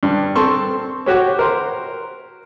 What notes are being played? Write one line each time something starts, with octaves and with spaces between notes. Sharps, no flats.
G2
C4 A4 A5 C6 C#6
F#4 G4 C#5
A#4 C5